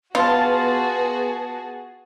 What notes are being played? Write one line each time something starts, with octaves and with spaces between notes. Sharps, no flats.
B3 F4 F#4 G#4 B4 A5